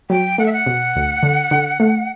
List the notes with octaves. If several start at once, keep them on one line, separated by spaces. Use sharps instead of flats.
F#3 G5
A3 F#5
E5
F#5
B2
D2
D3
D3
A3